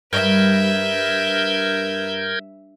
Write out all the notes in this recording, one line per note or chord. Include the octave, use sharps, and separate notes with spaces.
G2 A#4 B4 E5 G6 G#6